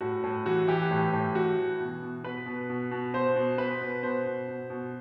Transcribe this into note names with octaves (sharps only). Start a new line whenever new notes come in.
A2 F#4
A2
E3 F#4
E3 G4
A2
A2
E3 F#4
E3
B2
B2
B2 B4
B2
B2
B2
B2 C5
B2
B2 B4
B2
B2 C5
B2
B2
B2